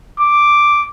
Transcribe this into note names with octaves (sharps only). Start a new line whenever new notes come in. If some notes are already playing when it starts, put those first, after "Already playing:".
D6